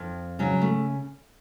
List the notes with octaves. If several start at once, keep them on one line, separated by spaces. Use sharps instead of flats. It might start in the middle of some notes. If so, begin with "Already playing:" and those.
Already playing: F2
C#3 F#3
A3